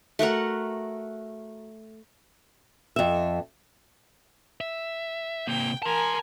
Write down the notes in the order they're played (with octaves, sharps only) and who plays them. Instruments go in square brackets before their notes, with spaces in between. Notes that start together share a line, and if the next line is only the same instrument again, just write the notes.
[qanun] A3 F#4 A#4 F#5
[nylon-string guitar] F2 E5
[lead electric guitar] E5
[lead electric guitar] C3 A#3 [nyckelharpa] G5
[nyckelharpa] A#4 G#5 [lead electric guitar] A5 C6